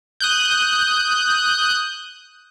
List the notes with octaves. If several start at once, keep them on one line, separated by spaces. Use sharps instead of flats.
D#6 F#6 G6